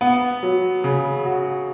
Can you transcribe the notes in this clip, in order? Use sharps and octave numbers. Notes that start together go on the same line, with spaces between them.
B3
F#3
C#3
F#4